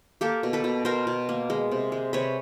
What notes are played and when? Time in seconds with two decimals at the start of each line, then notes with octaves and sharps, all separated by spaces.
0.21 A#3 G4 A4
0.43 B2
0.53 A4 B4
0.64 B2
0.85 B2 A#4 C5
1.07 B2
1.29 A#3
1.50 G#3
1.71 C3
1.92 G#3
2.13 C3 B4 C#5